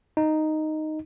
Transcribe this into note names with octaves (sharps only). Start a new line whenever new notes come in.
D#4